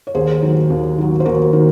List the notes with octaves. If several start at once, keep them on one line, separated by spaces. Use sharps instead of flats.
C#5
D#2 G#4 C5
D#3 F#3
D#2
D#3 F#3
C5
D#2 F#4 A#4
D#3